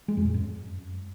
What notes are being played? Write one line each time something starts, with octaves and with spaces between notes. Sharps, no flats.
G#3
F2
A2
F#2